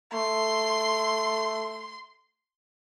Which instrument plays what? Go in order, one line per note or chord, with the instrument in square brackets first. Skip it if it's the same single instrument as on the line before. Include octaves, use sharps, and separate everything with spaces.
[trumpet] A3 [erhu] C6